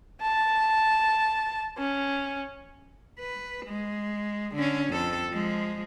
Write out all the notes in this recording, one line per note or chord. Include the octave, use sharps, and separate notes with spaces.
A5
C#4
B4
G#3
D3 C#4
F2 A4
F3 G#3